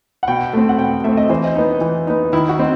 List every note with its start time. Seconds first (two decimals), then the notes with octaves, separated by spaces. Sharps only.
0.23 F#5
0.28 B2 G5
0.53 A3 C4
0.69 F#5
0.79 B2 G5
1.04 A3 C4 E5
1.17 D#5
1.29 E3 C5
1.44 D#5
1.56 B3 D#4
1.81 E3
2.07 B3 D#4
2.33 D#3 E4
2.49 F#4
2.58 C4 D#4